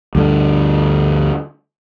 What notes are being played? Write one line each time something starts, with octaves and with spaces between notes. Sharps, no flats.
D2 G2 D3